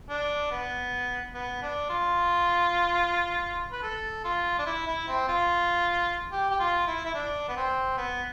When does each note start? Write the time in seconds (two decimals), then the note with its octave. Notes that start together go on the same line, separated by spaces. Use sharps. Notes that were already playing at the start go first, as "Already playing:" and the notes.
0.09 D4
0.51 B3
1.34 B3
1.63 D4
1.90 F4
3.72 B4
3.83 A4
4.24 F4
4.59 D4
4.66 E4
4.87 E4
5.08 C4
5.28 F4
6.32 G4
6.51 G4
6.60 F4
6.87 E4
7.05 E4
7.15 D4
7.49 B3
7.57 C4
7.97 B3